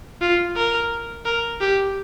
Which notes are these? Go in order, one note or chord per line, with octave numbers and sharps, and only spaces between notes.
F4
A#4
A#4
G4